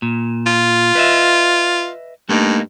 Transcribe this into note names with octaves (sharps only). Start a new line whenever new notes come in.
A#2
F4
B4 D#5 E5
G2 A3 A#3 D#4